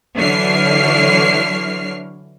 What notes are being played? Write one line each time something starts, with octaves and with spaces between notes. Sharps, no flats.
D3 E3 F#3 C#5 F6 C7